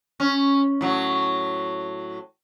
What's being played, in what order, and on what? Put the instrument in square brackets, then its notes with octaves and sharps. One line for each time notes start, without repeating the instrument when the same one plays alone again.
[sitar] C#4
A2 F#3